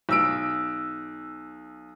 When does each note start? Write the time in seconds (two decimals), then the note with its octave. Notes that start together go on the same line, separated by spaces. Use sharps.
0.09 B1 E6 D7